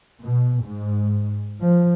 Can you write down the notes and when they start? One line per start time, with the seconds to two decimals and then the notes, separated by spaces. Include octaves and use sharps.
0.20 B2
0.61 G#2
1.61 F3